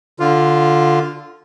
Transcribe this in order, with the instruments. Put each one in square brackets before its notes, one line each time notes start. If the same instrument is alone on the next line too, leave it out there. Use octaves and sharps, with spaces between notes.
[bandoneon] D3 F4